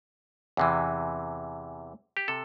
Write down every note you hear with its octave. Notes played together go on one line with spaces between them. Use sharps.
E2 C3 E3
G4
C3 A4